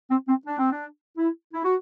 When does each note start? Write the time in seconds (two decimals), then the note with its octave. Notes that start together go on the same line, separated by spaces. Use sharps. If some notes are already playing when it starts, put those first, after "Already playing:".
0.10 C4
0.28 C4
0.46 D4
0.59 C4
0.72 D4
1.17 E4
1.53 E4
1.64 F#4